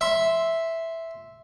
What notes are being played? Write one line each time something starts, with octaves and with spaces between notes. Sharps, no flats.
E5 C6